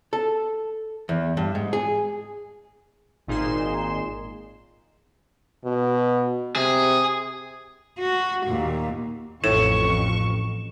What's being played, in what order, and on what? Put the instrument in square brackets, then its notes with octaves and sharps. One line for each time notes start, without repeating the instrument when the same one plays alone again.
[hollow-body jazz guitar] A4
E2
G2
G#2
G#4
[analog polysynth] G#1 A#2 D#4 G#4 C6 E7
[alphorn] B2
[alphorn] C3 [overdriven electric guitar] G#4
[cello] F#4
D#2 A#2
[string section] A1 F2 C#6 [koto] A2 [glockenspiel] E7